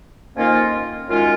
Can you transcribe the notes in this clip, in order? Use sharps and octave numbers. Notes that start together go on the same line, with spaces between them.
F2 D#3 A#3 C#4 F4
F#2 D#3 G#3 C#4 F4